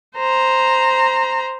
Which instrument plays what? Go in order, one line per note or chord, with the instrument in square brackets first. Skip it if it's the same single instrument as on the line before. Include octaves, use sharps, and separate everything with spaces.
[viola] C5 A#5